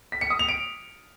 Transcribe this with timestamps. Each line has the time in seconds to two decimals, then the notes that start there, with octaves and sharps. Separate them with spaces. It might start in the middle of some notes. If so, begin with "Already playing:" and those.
0.12 B6
0.21 C#7
0.30 D#6
0.39 F7
0.48 D7